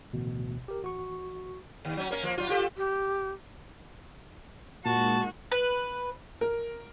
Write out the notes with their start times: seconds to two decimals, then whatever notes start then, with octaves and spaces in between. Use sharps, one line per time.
0.13 A1 D2 B2
0.68 G4 A#4
0.82 A1 F#4 C#6
1.85 D#2
1.97 F#3 C#4
2.11 A#3 C#4 A#4
2.23 F3 A#3
2.38 F#3 F4
2.49 F4 G4 A4
2.77 G4
4.86 A#2 G#3 A#3 D#4 F#4 A5
5.52 B4
6.41 A#4